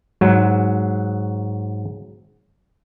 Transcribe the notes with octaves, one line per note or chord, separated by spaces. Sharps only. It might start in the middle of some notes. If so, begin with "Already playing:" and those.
G#2 F#3